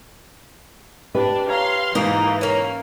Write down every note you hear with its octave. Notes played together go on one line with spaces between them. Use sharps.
D4 G4 B4 E5
C#5 F5 A#5 C6
G#2 E3 A#3 D#4
A#3 C#4